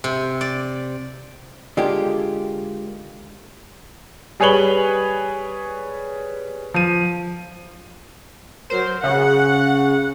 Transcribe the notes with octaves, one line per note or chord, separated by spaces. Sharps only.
C3
D5
D3 G#3 A#3 F4 G4
G3 G#4 B4 C#5 F#7 G7
F3 D#7
F#3 A#4 C5
C#3 F#5